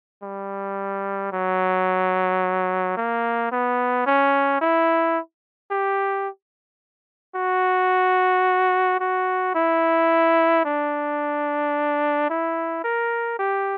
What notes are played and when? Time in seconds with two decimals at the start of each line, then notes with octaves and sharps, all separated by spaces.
0.23 G3
1.33 F#3
2.97 A#3
3.52 B3
4.06 C#4
4.61 E4
5.71 G4
7.36 F#4
9.00 F#4
9.55 E4
10.65 D4
12.30 E4
12.84 A#4
13.39 G4